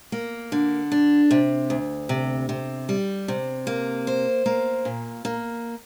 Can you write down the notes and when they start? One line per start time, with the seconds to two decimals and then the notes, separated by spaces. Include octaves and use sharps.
0.12 A#3
0.52 D3
0.92 D4
1.31 C3
1.70 D2
2.09 C3
2.49 C3
2.89 G3
3.28 C3
3.67 A#3
4.07 C5
4.46 A#3
4.85 A#2
5.25 A#3